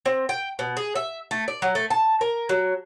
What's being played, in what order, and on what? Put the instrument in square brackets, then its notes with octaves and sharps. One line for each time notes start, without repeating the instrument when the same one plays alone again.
[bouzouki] C4
G5
B2
G#4
E5
A3
D5
F#3
A3
A5
A#4
F#3